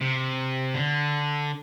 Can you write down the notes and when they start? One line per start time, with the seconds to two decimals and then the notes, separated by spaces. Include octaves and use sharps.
0.01 C3
0.74 D3